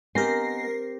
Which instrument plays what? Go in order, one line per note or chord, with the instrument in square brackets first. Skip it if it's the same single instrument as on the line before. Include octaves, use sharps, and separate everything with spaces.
[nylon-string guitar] B3 D#5 G#5 [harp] C4 G4 [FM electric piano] A#4 A#6 C7